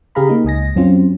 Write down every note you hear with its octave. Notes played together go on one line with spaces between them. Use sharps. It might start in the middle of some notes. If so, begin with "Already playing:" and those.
C#3 G4 G#4 F5 A#5 B5
A#3 D#4
C#2 D#5 G#5 A#6
F#2 F#3 C4 C#4 F4